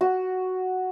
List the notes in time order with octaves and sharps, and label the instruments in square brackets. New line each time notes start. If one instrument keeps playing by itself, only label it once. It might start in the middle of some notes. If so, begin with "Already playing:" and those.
[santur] F#4